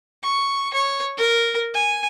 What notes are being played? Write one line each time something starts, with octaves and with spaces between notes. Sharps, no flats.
C#6
C#5
A#4
G#5